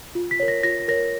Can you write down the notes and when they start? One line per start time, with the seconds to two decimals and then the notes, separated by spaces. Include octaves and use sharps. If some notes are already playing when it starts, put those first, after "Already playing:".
0.15 F4
0.31 B6
0.40 A#4 C#5
0.48 A#6
0.63 F4 A#6
0.88 A#4 C#5 A#6